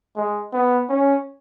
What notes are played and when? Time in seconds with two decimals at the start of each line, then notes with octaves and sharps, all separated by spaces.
0.16 G#3
0.53 B3
0.89 C#4